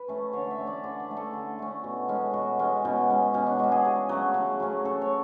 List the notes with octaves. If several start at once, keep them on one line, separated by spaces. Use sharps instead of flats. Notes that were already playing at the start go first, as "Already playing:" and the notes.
Already playing: B4
A3 C#4
D3 C#5
E5
A3 C#4
D5
D3 D5
D5
A3 C#4
A4
D3
A3 C#4
B2
G#3 C#4
B2 F#4
G#3 C#4
B2 C#4
G#3 C#4
B2 C#4
D4
G#3 C#4 F#4
G#4
C#3
F#3 A3 C#4
C#3
F#3 A3 C#4
C#3 A4
C#5